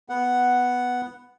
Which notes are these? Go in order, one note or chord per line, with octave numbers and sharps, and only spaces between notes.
B3 F#5